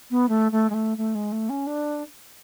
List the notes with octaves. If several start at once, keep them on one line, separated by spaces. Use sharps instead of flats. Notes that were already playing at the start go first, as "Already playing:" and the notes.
B3
A3
A3
G#3
A3
A3
G#3
A3
C#4
D4